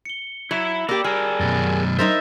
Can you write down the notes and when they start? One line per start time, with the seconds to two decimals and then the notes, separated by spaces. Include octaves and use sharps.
0.05 C#7 G7
0.51 F#3 E4 B5 E7
0.89 A#3 G4 D5 E6
1.04 G3 G#4 A#4 F6
1.40 F#2 B2 A6
1.99 D#4 A#4 C5 E5 G6 A6